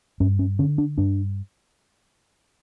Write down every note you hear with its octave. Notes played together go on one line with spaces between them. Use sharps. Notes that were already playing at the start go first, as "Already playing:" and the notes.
G2 C#4
C#4
D3 C#4
D4
G2 D4